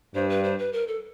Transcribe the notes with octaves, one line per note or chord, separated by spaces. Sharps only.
G2 C5
B4
C5
B4
A#4
A4